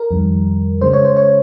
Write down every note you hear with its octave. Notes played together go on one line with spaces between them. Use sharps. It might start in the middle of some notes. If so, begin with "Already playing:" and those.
Already playing: A#4
F2 D#3 G3
C#3 G#3 C#4 C5
C#5
C5
C#5